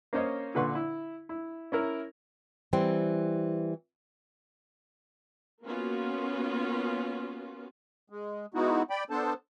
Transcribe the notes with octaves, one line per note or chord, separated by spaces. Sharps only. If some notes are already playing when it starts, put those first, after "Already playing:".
A#3 C#4 C5 C#5 D#5
A#2 D3 B4 F#5 C6 C#6
E4
E4
C#4 E4 A#4
E3 G3 C4
A#3 B3 C#4 F4 F#4
G#3
G#3 B3 D#4 E4 F#4
D5 G5 B5
B3 D4 A4 C5 A5